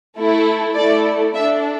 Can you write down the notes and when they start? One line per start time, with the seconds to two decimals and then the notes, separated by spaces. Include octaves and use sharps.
0.17 A3 E4 A4
0.75 A3 E4 A4 D5
1.34 D4 A4 E5